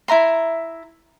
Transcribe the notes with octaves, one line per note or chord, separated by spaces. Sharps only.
E4 E5 A#5 C6